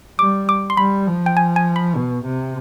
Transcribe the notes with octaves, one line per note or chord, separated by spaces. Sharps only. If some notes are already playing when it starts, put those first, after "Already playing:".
G3 D6
D6
C6
G3 B5
F3
G5
G#5
G#5
B5
B2
C3